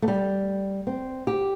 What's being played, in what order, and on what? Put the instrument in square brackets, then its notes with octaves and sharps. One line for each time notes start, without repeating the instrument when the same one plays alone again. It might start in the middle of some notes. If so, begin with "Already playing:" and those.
[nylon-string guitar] A3
G3
C4
G4